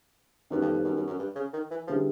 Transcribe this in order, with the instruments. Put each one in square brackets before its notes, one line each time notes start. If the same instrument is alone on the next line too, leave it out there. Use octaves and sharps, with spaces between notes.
[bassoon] F#2 [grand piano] D#3 G3 B3
[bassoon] F2
F2
F#2
F#2
F#2
G2
C#3
D#3
E3
[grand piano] D3 G3 B3 E4 G#4 [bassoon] F3